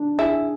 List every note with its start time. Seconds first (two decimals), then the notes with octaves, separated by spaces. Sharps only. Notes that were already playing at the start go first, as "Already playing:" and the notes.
Already playing: D4
0.19 E4 G#4